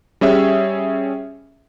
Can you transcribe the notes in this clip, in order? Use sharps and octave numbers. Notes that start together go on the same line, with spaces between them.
G3 C#4 G#4 E5